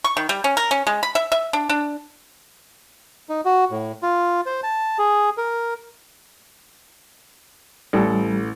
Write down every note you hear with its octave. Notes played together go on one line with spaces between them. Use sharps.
C#6
D#3
G3
C#4
A#4
C#4
G#3
B5
E5
E5
D4
D4
D#4
F#4
A2
F4
C5
A5
G#4
A#4
A1 G3 A4